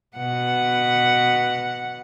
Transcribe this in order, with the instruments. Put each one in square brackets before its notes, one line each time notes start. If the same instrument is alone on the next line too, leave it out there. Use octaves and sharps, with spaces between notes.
[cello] B2 F#5